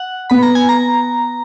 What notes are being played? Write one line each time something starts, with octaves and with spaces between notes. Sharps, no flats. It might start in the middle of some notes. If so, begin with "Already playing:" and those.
Already playing: F#5
B3 B5
A#5
G#5
A#5